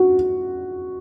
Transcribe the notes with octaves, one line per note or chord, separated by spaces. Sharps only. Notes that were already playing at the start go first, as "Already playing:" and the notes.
Already playing: F#4